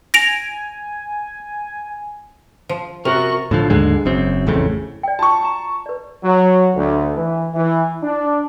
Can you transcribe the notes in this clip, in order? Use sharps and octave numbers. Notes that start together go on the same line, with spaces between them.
G#5 A#6 D7 F7
F3
C3 F#4 A#4 C#6
A2 D3 F3
D#2 G#2 D3 G#3
F#1 F#2 C4
A1 F2 A2 C#3
D5 G5
F4 F#4 A5 C#6
A#5 D6
B4 D5
F#3
D2
E3
E3
D4